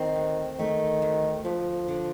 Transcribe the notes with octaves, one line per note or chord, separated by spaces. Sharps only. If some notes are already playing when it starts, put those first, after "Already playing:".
Already playing: D#3 C4
D2
D#3 A3
D2
D2 F3
D3